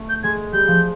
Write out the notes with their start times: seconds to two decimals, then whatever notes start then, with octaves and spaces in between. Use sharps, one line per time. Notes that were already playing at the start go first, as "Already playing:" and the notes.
Already playing: A3
0.09 G6
0.23 G#3 G#6
0.52 G3 G6
0.68 F3